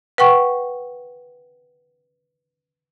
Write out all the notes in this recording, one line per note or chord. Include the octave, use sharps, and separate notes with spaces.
B4 F#5 G5 C#6